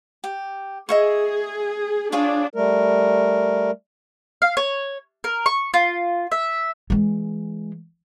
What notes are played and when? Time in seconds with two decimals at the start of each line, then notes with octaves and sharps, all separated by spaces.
0.24 G4
0.89 G#4 D#5 E5 C#6
2.12 D4 F4 G#4 C#5
2.54 G3 A3 A#4
4.42 F5
4.57 C#5
5.24 A#4
5.46 C#6
5.74 F4
6.32 E5
6.90 E3 G#3